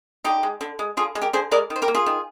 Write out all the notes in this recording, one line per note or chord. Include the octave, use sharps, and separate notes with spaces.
D3 D#4 G4
G#3
D3
G#3
D3 F4 G#4
G#3
G4 A#4
D3 G#4 C5
G#3 A#4 D5
D#3
C5
G4 A#4
A#3
F4 G#4
D#3